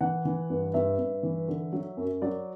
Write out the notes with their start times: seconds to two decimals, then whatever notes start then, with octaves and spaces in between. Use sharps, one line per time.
0.01 E3 F#5
0.25 E3
0.50 G2
0.74 G2 E5
0.98 G2
1.23 E3
1.48 D3
1.73 F#3
1.97 F#2
2.22 F#3 D5